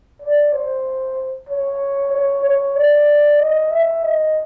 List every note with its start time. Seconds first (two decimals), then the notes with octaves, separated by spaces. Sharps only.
0.22 D5
0.53 C5
1.49 C#5
2.12 C#5
2.45 C#5
2.76 D5
3.40 D#5
3.71 E5
4.03 D#5